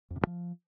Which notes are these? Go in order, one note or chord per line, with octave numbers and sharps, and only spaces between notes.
F2
C3
G2
F3